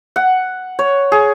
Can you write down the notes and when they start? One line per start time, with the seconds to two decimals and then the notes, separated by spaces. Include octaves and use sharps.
0.16 F#5
0.79 C#5
1.12 G#4